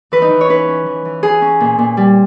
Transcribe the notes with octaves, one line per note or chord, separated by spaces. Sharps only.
E3 B4
D#4
E3
C#5
C#4 B4
C#4
E3
E3
E3 G#4
C#4
A#2
A#2
G3